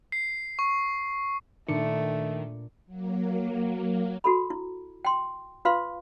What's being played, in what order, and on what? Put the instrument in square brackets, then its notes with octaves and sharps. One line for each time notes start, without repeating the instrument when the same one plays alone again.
[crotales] C7
C#6
[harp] A#2 D4 C#7 [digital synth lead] D#3 [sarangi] A3
[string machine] F#3 A#3
[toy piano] F#4 A4 B5
E4
G5 C6
F4 B4 F5 C6